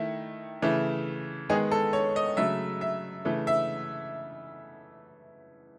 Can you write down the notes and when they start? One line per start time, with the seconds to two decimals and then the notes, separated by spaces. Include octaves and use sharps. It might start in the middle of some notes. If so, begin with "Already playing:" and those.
Already playing: D#3 A3 E4
0.62 C#3 E3 A3
1.50 D#3 G#3 B3 G#4
1.71 A4
1.93 C#5
2.16 D#5
2.37 C#3 F#3 A3 E5
2.81 E5
3.25 C#3 E3 A3
3.47 E5